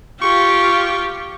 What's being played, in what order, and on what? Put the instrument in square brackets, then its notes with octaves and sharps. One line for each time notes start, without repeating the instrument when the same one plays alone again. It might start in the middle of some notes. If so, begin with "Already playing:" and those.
[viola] F4 G4 [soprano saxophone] C#6